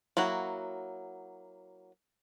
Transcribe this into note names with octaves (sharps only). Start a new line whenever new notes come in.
F#3 A#3 E4 F#4